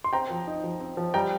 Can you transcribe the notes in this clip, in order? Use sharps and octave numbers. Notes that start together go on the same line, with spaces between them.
C6
C4 G5 A#5
F3
D#4
F3
C4
F3
G3 G5 A#5